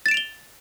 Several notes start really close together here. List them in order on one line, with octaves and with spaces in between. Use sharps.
A6 E7 D7 F7 G7